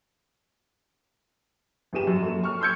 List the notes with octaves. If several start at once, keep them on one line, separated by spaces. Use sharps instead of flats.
G1 G3 G#4 D#7 E7
F#2
F#3 A#3 A4
C#6 F6
C6 E6 G6 G#6 C#7